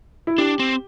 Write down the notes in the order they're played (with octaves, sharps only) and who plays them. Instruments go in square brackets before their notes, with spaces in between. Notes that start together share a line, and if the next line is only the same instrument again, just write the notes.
[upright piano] E4
[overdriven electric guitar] D4 [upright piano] G4
[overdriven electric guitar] C4